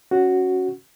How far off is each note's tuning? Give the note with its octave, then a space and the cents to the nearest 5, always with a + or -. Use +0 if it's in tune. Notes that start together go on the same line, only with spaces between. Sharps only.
C#4 +0 F#4 +0